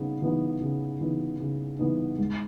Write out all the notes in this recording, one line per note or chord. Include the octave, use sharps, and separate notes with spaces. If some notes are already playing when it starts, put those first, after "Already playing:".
Already playing: C#3 B3 D#4
E3 B3 D#4
C#3
E3 B3 D#4
C#3
E3 B3 D#4
G#2